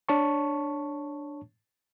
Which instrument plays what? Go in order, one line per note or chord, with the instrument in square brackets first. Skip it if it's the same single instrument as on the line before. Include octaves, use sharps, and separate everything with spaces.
[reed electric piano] D4 C#5 A5 C#6